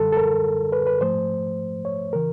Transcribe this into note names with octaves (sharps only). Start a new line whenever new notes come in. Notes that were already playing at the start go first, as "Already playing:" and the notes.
Already playing: F#2 D3 G3 A4
A4
A#4
B4
B4
G#2 F3 A3 C5
C#5
C#3 E3 A#4